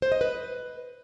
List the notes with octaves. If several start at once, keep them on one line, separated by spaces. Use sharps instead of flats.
C5
D#5
B4